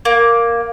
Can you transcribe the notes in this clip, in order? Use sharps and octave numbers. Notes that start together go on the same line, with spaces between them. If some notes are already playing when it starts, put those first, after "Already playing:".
A#3